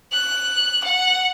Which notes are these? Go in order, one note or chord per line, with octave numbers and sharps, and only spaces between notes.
F#6
F#5